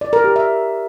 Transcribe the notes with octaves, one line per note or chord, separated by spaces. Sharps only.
D5
A#4
G4
E5